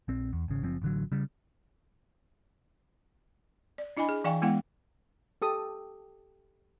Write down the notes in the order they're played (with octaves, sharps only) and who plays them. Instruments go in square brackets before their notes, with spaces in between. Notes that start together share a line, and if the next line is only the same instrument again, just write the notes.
[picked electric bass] A#1 C4
E2
G#1 C#3
F#1 F3 C4
A1 D3 F#3
C#3 G3
[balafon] D5
D4 E4 D#5 G#5 B5
G#4
E3 D5 F5 G5 G#5 C#6
G#3 B3 E4 F#5 G5
[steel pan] G4 A4 D#6